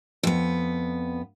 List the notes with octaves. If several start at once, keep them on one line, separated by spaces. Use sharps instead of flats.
F2 B3